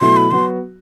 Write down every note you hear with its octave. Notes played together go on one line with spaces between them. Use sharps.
B2 F#3 A3 E4 C6
B5
F#3 B3 F#4 C6